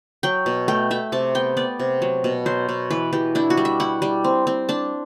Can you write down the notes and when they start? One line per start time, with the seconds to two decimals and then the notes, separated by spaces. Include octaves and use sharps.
0.23 F#3 G5
0.46 B2
0.68 A3 G5
0.91 A3 E5
1.12 C3 A5
1.35 B3 G5
1.57 B3 D5
1.80 C3
2.02 F#3
2.24 B2
2.46 F#3 C5
2.69 B2
2.90 E3 B4
3.13 E3 G4
3.35 D4 E4
3.50 F#4
3.57 G3
3.65 E5
3.80 E4 F#5
4.02 G3
4.24 C4
4.47 C4
4.69 D4 A5